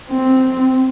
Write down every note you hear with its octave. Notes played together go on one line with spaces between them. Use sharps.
C4